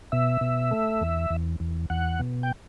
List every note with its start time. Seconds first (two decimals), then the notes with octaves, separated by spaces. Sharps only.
0.12 B2 E5
0.41 B2
0.71 A3
1.01 E2
1.30 E2
1.60 E2
1.90 E2 F#5
2.20 B2
2.43 G5